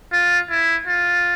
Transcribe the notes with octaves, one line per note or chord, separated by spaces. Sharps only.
F4
E4
F4